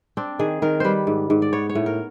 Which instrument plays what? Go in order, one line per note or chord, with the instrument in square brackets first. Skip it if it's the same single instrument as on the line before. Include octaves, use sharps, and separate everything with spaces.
[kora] C4 D4
D#3 G#4
D#3 A#4
G3 B4 C5
G#2
G#2
D5
B3 C#5
C#5
A2
A#4